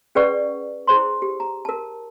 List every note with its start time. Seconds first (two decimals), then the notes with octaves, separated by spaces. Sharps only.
0.15 C#4 G#4 B4 D5 F#5 C#6
0.87 E4 G#4 C5 C6
1.22 G4
1.40 A#5
1.65 A#4 A5